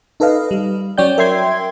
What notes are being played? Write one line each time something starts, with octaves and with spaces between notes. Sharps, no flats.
D#4 A4 B4 D#5 F5
G3
F#3 C#4 C#5 D5 G5 G6
A#4 E5 G5 C6 G#6